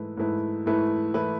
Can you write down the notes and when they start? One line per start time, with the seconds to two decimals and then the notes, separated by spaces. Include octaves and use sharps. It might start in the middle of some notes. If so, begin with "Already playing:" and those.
Already playing: G#2 E3 A3 E4 B4
0.17 G#2 E3 A3 E4 B4
0.66 G#2 E3 A3 E4 B4
1.14 E3 A3 E4 B4